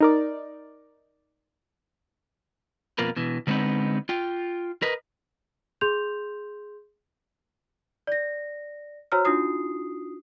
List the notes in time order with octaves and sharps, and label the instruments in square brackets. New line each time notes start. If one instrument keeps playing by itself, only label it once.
[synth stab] D#4 A#4 D5
[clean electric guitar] F2 B2 A#3 F4 A#4 B4
B2 E3
D3 G#3 B3 C4 D#4 B4
F4 G5
A#4 B4 D#5
[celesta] G#4 C6 G6 F7
D5 A#6
F#4 C5 C#5 A#5 E6 F6
D4 D#4 F4 F#4 D#6 C7